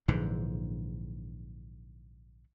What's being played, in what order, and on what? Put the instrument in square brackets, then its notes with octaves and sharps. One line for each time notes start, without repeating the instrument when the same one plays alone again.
[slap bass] A#1 G#2 D3 E3